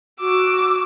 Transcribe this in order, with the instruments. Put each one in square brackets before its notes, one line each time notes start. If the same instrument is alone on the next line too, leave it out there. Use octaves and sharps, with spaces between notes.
[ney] F#4 [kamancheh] D6 E6